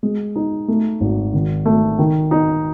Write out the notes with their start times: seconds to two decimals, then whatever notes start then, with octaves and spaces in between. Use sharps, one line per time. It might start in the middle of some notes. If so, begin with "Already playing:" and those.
0.03 G#3
0.35 D#4
0.68 A3
1.01 G#1
1.34 D#3
1.66 A3
1.99 D#3
2.31 D#4